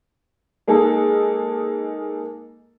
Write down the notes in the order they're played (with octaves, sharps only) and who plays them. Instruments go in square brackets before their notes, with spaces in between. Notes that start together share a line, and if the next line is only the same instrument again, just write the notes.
[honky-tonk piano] G#3 A#3 D#4 G#4 A4